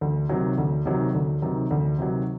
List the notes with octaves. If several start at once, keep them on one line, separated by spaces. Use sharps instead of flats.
D2
C3 D#3 F#3
D2
C3 D#3 F#3
D2
C3 D#3 F#3
D2
C3 D#3 F#3